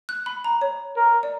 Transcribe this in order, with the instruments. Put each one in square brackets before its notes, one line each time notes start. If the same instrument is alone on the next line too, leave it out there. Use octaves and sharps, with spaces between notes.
[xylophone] F#6
B5
A#5
C#5
[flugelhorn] A#4
[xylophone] D5